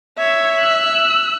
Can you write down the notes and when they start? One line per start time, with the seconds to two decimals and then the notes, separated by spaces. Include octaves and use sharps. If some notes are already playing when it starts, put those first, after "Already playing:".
0.19 C#5 E5 G#6
0.60 E6 F#6